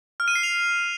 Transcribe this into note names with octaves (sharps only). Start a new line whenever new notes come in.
F6
D#7
C7
F7